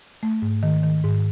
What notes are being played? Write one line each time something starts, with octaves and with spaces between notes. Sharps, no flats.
A3
G#2
D#3
D#3
G#2